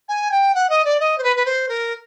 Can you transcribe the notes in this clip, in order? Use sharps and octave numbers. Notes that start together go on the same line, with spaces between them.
G#5
G5
F#5
D#5
D5
D#5
C5
B4
B4
C5
A#4